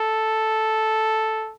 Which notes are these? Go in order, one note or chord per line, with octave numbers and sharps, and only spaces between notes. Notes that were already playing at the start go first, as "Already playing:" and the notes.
Already playing: A4